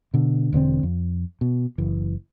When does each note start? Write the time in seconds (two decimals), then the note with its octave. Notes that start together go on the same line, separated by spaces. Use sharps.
0.14 B2 D3
0.52 E1 D3 B3 C4
0.83 F2
1.41 B2
1.78 F#1 E3